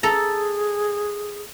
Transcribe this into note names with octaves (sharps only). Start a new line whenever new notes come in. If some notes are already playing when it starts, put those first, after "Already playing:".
G#4 A4 A#5